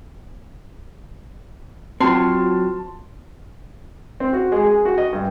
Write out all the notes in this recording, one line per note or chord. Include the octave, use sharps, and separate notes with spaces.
F#3 C4 F4 F#4 A5 C6
C4
F#4
G#3
G#4
F#4
D#5
G2